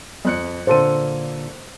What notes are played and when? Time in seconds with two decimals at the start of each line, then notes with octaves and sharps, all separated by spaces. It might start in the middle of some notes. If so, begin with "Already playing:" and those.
0.25 F2 F#6 C#7
0.67 A#2 D3 A#3 A4 C5 D#7